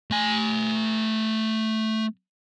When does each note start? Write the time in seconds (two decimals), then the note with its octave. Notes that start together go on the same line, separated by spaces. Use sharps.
0.11 A3 G#5